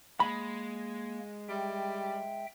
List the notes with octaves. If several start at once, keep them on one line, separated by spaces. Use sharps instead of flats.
G#3 A#3 B5
G3 E5 G5